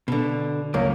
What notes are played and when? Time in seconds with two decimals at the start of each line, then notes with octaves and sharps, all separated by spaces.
0.08 B2 D3
0.74 C#2 F#2 A#3